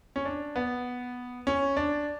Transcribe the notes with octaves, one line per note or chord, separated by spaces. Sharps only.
C#4
D4
B3
C#4
D4